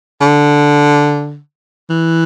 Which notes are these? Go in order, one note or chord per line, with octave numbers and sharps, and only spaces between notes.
D3
E3